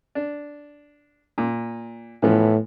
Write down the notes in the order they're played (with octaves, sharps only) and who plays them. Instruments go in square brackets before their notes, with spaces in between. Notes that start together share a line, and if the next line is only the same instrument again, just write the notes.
[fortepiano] D4
A#2
[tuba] A2 [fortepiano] E3 F3 B3